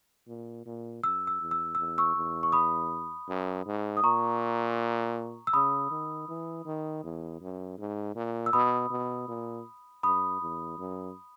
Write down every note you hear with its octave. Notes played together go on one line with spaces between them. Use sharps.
A#2
A#2
F#2 E6
E6
E2
E6
E2 E6
C#6 E6
E2
C#6
B5 D#6
F#2
G#2
D#6
A#2 A#5 C#6
E6
C#3 B5 D#6
D#3
E3
D#3
E2
F#2
G#2
A#2
E6
B2 B5 D#6
B2
A#2
F#2 B5 D#6
E2
F#2